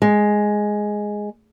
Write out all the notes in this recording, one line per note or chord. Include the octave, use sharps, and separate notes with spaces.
G#3